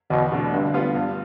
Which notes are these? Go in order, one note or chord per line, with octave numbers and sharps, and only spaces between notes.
E2 B2
B2 A3 D4
G2 D3
G3 B3 F4
G2